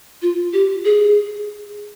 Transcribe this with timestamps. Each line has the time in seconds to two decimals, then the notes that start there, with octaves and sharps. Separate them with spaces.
0.22 F4
0.53 G4
0.85 G#4